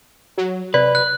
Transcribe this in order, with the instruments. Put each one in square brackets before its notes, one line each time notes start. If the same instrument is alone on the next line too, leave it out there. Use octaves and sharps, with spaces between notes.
[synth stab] F#3
[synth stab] C3 [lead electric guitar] B4 [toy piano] D5
[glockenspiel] F#6